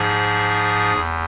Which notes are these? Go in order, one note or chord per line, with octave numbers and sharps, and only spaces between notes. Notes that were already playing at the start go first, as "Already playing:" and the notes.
Already playing: G#2 F3 G#4
E2